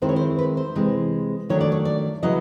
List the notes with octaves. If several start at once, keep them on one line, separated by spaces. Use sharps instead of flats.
D#3 G#3 C4 E4 C5
C#5
C5
B4
C5
C3 E3 G#3
D#3 F#3 A3 D4 C#5
D5
C#5
D5
C#3 F#3 B3 E4 D#5